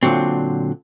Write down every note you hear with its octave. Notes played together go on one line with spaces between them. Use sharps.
A#2 D3 F#3 C4